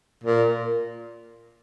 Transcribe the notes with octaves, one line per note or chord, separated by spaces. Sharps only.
A#2